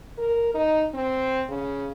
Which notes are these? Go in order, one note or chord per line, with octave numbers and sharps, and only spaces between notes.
A#4
D#4
C4
C#3